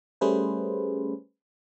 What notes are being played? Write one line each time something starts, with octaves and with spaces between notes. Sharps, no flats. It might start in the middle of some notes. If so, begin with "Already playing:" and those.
G3 A3 C#4 G#4 B4 C5